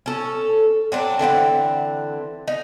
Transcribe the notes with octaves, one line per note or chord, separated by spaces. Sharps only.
C#4 A4
F#3 C4 D4
D3 E3 C4 F#5
D#4